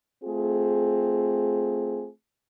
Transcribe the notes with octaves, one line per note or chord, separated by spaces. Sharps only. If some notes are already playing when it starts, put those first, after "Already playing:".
A3 C4 F4 G#4